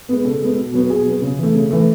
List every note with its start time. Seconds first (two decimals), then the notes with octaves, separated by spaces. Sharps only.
0.09 G#3 B3
0.25 C#3 A4
0.42 G#3 B3
0.58 B2
0.74 F#3 B3
0.90 B2 G#4
1.06 F#3 B3
1.22 C#3
1.39 E3 A3
1.54 C#3
1.71 E3 A3